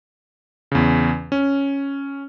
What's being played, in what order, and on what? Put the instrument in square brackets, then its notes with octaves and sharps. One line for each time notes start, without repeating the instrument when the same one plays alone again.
[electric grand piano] E2 C#3
C#4